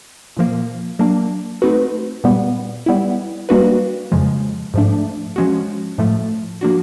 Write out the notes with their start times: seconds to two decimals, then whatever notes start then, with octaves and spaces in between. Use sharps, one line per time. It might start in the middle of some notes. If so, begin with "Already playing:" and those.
0.36 A#2 F3 A#3
0.99 F#3 A#3 D4
1.62 A3 C4 D#4 F#4 B4
2.24 A#2 G3 B3
2.86 G3 B3 E4
3.49 G3 A#3 D4 F#4 B4
4.12 F2 C#3 F3 G#3
4.74 G#2 F3 A3 D4
5.36 F3 G#3 C#4 F#4
5.98 A2 F3 A3
6.61 F3 A#3 D4 F#4